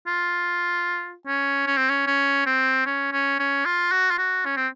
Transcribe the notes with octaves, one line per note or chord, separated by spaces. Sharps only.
F4
C#4
C#4
C4
C#4
C#4
C4
C#4
C#4
C#4
F4
F#4
F4
F#4
C#4
C4